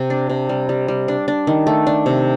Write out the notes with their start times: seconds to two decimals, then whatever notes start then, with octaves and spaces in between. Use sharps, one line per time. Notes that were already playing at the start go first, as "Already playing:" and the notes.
Already playing: C3
0.10 D4
0.30 C3
0.49 G3
0.69 G3
0.88 G3
1.08 D4
1.28 D4
1.47 D#3
1.67 A3
1.87 D4
2.06 C3